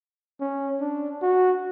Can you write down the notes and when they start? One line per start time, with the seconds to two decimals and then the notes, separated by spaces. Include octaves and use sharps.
0.40 C#4
0.81 D4
1.22 F#4